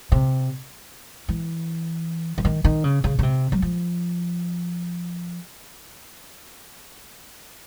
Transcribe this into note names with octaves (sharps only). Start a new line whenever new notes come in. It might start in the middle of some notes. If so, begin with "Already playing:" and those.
C3
E3
E3
D#3
D#3
C#3
C#3
C#3
C3
F#3
F3